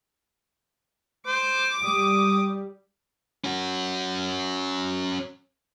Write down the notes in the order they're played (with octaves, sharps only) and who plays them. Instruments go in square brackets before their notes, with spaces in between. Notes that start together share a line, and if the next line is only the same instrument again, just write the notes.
[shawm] C5 [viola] D6
[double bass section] G3 [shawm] D#6
[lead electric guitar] C#4 F#4